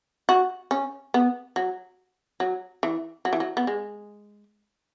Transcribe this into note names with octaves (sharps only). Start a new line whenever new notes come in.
F#4
C#4
B3
F#3
F#3
E3
F#3
E3
F#3
B3
G#3